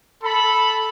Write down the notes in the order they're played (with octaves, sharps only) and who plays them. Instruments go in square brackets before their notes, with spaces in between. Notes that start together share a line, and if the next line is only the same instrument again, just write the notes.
[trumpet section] A4 B5